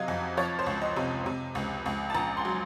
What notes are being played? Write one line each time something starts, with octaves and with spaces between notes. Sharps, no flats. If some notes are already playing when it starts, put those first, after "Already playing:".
Already playing: C3 F#3 D#5 F5
F2
F3 C#5
C5
C#2
D#5
C3
C3
C#2
C#2
A5
A#1 A#5
C6
F#3